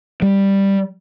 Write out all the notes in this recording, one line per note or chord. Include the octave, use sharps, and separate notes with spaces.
G3